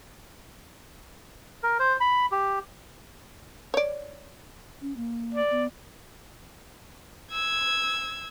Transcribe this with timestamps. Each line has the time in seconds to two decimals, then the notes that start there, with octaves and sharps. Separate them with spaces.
1.63 A#4
1.79 C5
2.00 B5
2.32 G4
3.74 C#5 D5
4.81 C#4
4.96 A#3
5.34 D5
5.51 B3
7.32 E6 G#6